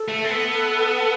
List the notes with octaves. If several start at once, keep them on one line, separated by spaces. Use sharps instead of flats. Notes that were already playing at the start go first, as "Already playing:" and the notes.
Already playing: A4
A3
C4
B3